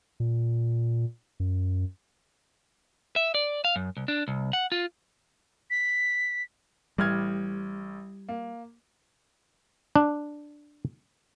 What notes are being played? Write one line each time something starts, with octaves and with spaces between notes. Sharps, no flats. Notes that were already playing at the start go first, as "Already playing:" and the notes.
A#2
F#2
E5
D5
F5
F#2
C2
D4
C2
F#5
F4
B6
A1 G3 F6 G#6
A#3
D4